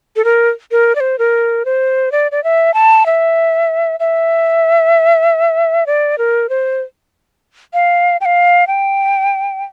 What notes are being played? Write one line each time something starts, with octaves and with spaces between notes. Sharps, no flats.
A4
A#4
A#4
D5
C5
A#4
C5
D5
D5
E5
A5
E5
E5
D5
A#4
C5
F5
G5
F5
G5